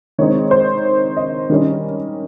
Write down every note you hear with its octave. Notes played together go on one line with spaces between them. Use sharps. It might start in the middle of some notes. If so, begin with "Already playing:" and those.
D#3 G#3 C4 D#4 C#5
C5
D#5
D#3 G3 C#4